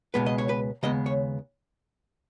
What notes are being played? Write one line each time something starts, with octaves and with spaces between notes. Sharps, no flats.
C#2 B2 G#3 B3 B4
D#5
C#5
B4
D#2 C#3 G#3 B3 D#5
C#5